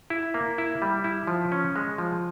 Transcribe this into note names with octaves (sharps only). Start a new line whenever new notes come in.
E4
A#3
E4
G3
E4
F3
C#4
G#3
F3